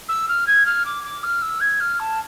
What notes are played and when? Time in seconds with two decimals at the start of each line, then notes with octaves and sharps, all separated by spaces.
0.08 E6
0.28 F6
0.47 G#6
0.66 F6
0.85 D6
1.04 D6
1.23 F6
1.42 E6
1.60 G#6
1.80 F6
1.99 A5